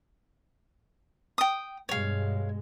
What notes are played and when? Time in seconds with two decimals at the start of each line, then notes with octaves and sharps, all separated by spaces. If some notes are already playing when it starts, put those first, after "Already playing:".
1.38 G5 D#6
1.89 G2 B2 G#3 C#5 F5